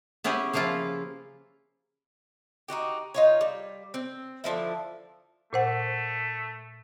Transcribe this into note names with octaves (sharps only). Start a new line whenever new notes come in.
B3 C#4 E4 G4 G#4
C#3 F3 A#3 E4 F4
D#4 E4 F#4 G4
D#4 F4 C#5
G3
C4
D3 F3 A#3 E4
A#2 A3 C5 F#5